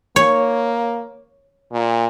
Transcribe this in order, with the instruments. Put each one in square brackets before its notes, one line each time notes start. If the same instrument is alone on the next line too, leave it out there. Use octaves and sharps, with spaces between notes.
[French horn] A#3 [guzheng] C#5
[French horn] A#2